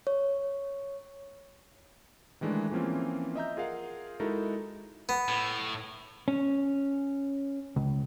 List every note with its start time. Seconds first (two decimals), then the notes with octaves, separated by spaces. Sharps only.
0.07 C#5
2.41 D#3 E3 G#3 A3 D4
2.71 E3 F3 A#3 C4 C#4 F4
3.35 D#5 E5 A#5 G6
3.57 F4 G#4 A#4 F5 F#5
4.20 G#3 D#4 E4 F#4 A4 A#4
5.09 B3
5.28 A2
6.28 C#4
7.76 C#2